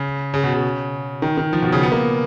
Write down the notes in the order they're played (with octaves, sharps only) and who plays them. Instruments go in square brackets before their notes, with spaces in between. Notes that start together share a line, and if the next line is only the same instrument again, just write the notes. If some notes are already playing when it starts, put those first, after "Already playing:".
Already playing: [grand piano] C#3
C#3
B2
C#3
D#3
D#3
F3
B2
C#3
B3
A#3